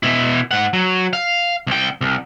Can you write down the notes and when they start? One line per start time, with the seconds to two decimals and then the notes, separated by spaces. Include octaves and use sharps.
0.03 B2 E4
0.51 G#2 F#5
0.73 F#3
1.13 F5
1.67 C2 G5
2.01 C2